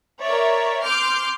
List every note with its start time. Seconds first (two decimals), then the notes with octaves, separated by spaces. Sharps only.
0.23 A#4 C#5 D5 E5
0.83 C6 D6 F6 G6 D7